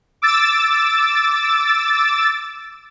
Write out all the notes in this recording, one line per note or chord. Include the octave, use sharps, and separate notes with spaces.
D6 E6 A6